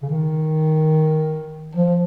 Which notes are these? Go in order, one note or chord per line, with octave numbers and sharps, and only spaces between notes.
C#3
D#3
F3